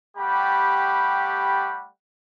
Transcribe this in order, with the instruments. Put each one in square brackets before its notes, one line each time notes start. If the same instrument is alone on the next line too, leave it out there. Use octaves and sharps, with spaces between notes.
[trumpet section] G3 A3 G4 F#5 B5